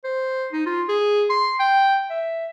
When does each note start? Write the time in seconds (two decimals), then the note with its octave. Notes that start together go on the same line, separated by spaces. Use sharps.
0.04 C5
0.52 D#4
0.66 F4
0.89 G#4
1.30 C6
1.60 G5
2.10 E5